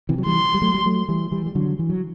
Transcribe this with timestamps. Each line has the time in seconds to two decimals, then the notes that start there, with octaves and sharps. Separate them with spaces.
0.09 C3 E3
0.18 F#3
0.26 E3 G3 C6
0.54 G3
0.62 F#3 A3
0.75 G3
0.86 F#3 A3
1.08 E3 G3
1.32 E3 G3
1.46 G3
1.55 D3 F#3
1.79 E3
1.90 F#3